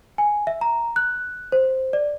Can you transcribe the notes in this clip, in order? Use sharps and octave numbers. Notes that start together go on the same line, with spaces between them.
G#5
E5
A#5
F#6
C5
D5